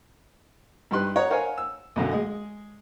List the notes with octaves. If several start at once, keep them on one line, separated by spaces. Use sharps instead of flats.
G2 D#4 G4 B4 C6 F#6
C#5 D#5 F#5 A#5
A#4 C5 C#5 F5 F#5 G#5
E6
B1 F#2 D3
G#3 G#4 D#5